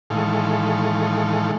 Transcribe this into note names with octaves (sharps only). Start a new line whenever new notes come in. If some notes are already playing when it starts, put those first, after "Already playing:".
A2 D#3 E3 G#3 A4 F5